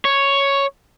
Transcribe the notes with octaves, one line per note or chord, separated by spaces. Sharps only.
C#5